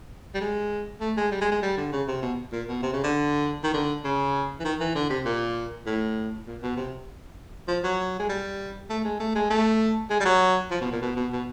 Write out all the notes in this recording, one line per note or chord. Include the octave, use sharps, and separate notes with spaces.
G3
G#3
A3
G#3
G3
G#3
G#3
G3
D3
C#3
C3
B2
A#2
B2
C3
C#3
D3
D#3
D3
C#3
E3
D#3
E3
D3
C3
A#2
A2
A#2
B2
C3
F3
F#3
G#3
G3
A3
G#3
A3
G#3
A3
G#3
G3
F#3
F3
B2
A#2
B2
B2
B2